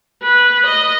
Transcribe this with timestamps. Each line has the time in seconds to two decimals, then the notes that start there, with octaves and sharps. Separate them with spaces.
0.23 B4
0.66 D#5